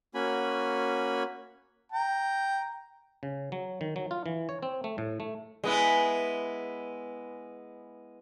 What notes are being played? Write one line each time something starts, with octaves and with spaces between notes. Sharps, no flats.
A#3 C#4 F#4 G#5 B5
G5 A#5
C#3
F#3
D#3
F#3
F4
E3
C#5
C4
A3
A2
A3
G#3 B3 E4